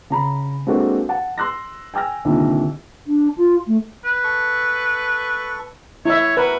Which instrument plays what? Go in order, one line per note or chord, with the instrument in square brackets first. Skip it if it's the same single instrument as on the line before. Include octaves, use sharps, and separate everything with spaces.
[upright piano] C#3 A#5 B5
G#3 A#3 C4 D4 F#4 A4
F#5 A5
C6 E6 F#6 A#6
G5 G#5 E6 F6 A#6
C2 A#2 D3 D#3
[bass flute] D4
F4
A3
[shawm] B4
[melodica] A4 C#6
[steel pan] E4 E5 [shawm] C#5
[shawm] F#4 [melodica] A#4 [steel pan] B4